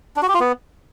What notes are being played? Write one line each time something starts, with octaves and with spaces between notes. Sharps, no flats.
D4
F#4
G4
F4
B3